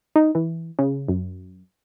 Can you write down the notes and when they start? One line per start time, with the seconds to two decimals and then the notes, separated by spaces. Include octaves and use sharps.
0.16 D#4
0.35 E3
0.79 C#3
1.08 F#2